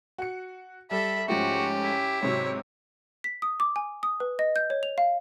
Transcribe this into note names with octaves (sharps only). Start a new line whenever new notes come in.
F#4 C#7
G3 A4 E5 B5
G#2 F3 A3 C#4 F#4 G4
E4
G#2 C3 F#3 C#5
B6
D#6
D6
G#5
D#6
B4
D#5
G6
C#5
F7
F5